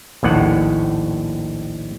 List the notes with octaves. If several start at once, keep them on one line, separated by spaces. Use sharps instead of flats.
A#1 D#2 A2 F#5